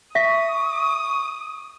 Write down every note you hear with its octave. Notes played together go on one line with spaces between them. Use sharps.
E5 C#6 D#6 B6